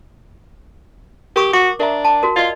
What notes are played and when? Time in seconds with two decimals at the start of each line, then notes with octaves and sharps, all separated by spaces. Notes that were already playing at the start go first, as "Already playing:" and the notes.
1.36 G4 A#4 C#6 D#6
1.53 F#4 D6
1.80 D4 A#4 E5 A#5
2.05 A5 D6
2.23 F#4 A#4
2.36 F4 D5 D#5